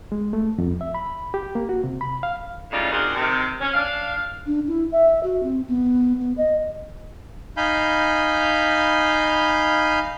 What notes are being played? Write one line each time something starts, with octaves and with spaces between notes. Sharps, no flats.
G#3
A3
F2
E5
B5
G4
A#3
F#4
C3
B5
F5
A2 C#3 G3 D#4 F4 D5
D#3 C4 D4 F4 F#4 G#4
C3 D#3
C#4
D4 F5
D4
E4
E5
F#4
C4
B3
B3
D#5
D#4 F5 G#5 B5 G6